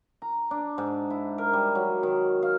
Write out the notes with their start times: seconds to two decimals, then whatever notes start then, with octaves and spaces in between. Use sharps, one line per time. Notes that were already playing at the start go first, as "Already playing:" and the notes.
0.22 A#5
0.51 D4
0.78 G#2
1.10 E4
1.38 A#4
1.53 G3
1.75 F#3
2.03 D#3
2.43 F5